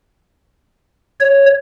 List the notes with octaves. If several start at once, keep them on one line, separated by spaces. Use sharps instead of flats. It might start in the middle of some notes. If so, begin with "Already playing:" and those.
C#5